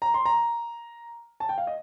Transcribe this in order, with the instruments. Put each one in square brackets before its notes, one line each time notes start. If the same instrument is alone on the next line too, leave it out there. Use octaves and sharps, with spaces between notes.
[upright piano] A#5
C6
A#5
A5
G5
F5
D#5